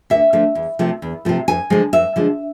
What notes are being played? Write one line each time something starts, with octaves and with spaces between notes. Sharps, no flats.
D2 E5
D3 F3 A3
E2
C3 F3 A3
E2
C3 F3 A3
F2 G#5
D3 F3 G#3
F2 E5
D3 F3 G#3